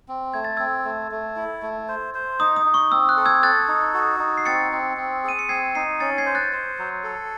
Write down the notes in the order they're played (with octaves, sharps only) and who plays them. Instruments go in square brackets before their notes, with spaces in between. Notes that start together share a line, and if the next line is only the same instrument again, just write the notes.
[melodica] C4
[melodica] A3 [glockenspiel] G#6
[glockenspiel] A6
[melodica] C4 [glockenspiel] E6 G#6
[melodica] A3
A3
E4
A3
C5
C5
[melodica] D#4 [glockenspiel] D#6
[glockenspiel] D#6
[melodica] D#4
[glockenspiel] C#6
[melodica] C4 [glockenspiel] E6
[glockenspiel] F#6
[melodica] A4
[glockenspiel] E6 G#6
[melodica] A4 [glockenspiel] F#6 A6
[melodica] D#4
F#4
D#4
[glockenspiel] C7
[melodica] C4 [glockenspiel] A6 C#7
[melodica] C4
C4
[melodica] G#4 [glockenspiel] D#7
[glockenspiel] C#7
[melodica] C4 [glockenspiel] G#6 C7
[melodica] D#4 [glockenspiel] C7 D#7
[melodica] C#4 [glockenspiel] A6 C#7
[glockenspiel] G#6 C7
[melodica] C5
[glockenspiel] F#6 A6
[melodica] C5
F#3
A4